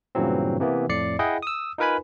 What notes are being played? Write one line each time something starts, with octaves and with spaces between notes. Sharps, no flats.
G2 A#2 C#3 E3 F#3 C4
C3 E3 A#3 B3
F2 A2 D5 C7 C#7
E4 G#4 D#5 F#5 G5
D#6 E6
D#4 F4 A#4 B4 G#5 B5